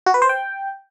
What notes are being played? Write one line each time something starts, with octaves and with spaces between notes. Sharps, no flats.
F#4
B4
C5
G5